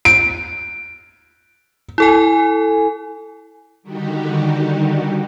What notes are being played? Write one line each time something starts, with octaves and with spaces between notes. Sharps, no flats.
D7
E4 A4 G#5
D3 D#3 G3 D#4 F#4 G4